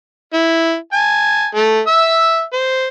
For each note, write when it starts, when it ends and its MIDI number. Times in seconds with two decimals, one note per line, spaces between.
0.33 0.75 64
0.93 1.47 80
0.93 1.47 81
1.55 1.80 57
1.55 1.80 81
1.87 2.43 76
1.87 2.43 88
2.53 2.87 72